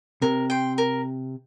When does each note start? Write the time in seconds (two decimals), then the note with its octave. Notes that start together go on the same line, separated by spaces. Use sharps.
0.22 C3 A#4
0.50 G5 C6
0.78 A#4